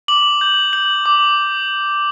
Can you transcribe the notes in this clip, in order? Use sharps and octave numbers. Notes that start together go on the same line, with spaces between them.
D6 F#7
G6
G6 F#7
D6